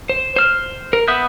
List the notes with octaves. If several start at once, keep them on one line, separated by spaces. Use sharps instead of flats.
C5
C5 F6
A#4
B3 E5 D#6 F#6 G6